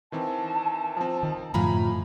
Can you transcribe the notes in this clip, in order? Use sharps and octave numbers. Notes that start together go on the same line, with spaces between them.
D#3 E3 C4 A5
F3 C4
D#3
F#2 A2 D3 F3 F4 G#5 A#5 B5